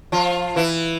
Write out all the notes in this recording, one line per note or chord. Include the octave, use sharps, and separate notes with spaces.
F3 F4
E3 E4